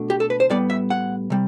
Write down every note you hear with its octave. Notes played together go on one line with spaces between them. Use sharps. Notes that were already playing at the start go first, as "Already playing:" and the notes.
Already playing: B2 A3 D4
G4
A4
B4
C5
A2 G3 B3 D5
E5
F#5
C3 G3